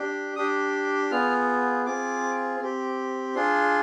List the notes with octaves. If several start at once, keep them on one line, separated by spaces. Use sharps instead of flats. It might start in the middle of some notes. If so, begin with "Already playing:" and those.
Already playing: D4 G4
D4 G4 D#6
B3 F4 G#4 F6
C4 F4 G#4 D6
C4 G4
D4 F4 G#4 C6